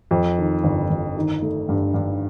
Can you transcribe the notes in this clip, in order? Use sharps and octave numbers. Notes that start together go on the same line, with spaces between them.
F2
D#3
G1
G1
D#3
A3
G2
G2